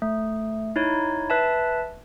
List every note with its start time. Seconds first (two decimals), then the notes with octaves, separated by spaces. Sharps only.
0.02 A3
0.76 D#4 E4 C#5
1.30 B4 E5 A5